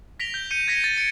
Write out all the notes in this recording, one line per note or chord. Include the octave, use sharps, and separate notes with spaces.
A#6 B6 D7 F7 G7
G6 G7
G6 C#7 D#7
G#6 A#6 B6 C#7 D#7
A6
C#7 D7